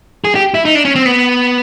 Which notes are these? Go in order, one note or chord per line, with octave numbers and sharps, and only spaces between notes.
G#4
G4
E4
D#4
D4
C#4
C4
B3